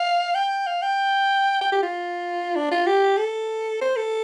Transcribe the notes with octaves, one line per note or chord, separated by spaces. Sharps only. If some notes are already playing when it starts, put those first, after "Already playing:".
Already playing: F5
G5
F5
G5
G5
G4
F4
D4
F4
G4
A4
C5
A4